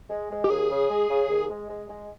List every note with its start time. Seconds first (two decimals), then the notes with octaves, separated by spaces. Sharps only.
0.10 G#3
0.31 G#3
0.44 G4
0.50 D#2 G#4
0.70 C#3
0.90 G#3
1.10 C#3
1.29 D#2
1.50 G#3
1.69 G#3
1.89 G#3